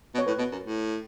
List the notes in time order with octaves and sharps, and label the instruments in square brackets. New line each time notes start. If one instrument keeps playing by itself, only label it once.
[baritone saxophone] B2
[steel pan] C#5
[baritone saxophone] A2 [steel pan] B4
[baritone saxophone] B2
F#2
A2